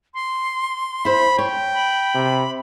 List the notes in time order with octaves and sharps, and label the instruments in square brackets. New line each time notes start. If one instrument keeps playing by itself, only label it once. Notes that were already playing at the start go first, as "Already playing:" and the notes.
[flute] C6
[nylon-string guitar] E4 C5 [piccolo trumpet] B5
[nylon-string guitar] C#5 [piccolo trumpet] G5
[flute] B5
[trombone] C3